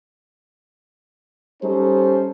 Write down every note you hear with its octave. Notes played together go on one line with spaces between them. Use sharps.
G3 C#4 D#4 A4 C5